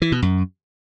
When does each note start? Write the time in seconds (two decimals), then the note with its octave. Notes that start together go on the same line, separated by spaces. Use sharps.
0.02 E3
0.12 B2
0.22 F#2